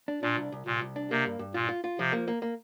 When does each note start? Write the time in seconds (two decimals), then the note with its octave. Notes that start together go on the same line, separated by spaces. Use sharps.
0.08 D4
0.22 A#2 D4
0.37 C2
0.52 C2
0.66 C2 A#2
0.81 C2
0.96 D4
1.10 C3 A#3
1.26 G2
1.39 G2
1.54 A#2 F4
1.69 F4
1.84 F4
1.99 C3 F3
2.13 A#3
2.28 A#3
2.42 A#3